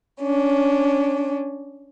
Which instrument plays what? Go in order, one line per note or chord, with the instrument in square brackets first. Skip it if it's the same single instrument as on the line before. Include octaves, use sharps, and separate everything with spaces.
[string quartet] C#4 D4